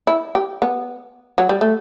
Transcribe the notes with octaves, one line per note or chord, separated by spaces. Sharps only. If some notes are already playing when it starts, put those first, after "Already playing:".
E4
G4
B3
F#3
G3
A3